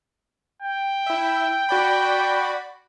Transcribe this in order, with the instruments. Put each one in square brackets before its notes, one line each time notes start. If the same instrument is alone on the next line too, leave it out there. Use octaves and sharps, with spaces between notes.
[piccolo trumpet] G5
[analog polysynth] E4 E5
F#4 D5 B5